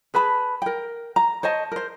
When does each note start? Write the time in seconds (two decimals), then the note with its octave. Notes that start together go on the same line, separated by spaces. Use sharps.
0.14 G#4 B4 A5 B5
0.62 A#4 G5
1.16 A#5
1.43 C5 C#5 D#5 A5
1.72 A#4 C5